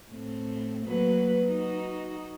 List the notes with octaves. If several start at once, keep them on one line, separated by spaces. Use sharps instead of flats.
A2 C4
F#3 A#3 B4
D#4 F#4